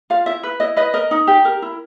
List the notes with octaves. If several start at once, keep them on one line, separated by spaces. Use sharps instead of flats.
F4 F5
E4 E5
B4
E4 D#5
B4 D#5
A#4 D#5
D#4
G4
A#4
E4